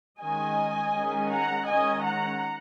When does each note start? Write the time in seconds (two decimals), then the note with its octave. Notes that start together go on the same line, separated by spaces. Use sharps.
0.19 D#3 G#3 C#4 D#5 G#5
0.94 D#3 G#3 C#4
1.32 F#5 A#5
1.68 D#3 G#3 C#4 D#5 G#5
2.05 F#5 A#5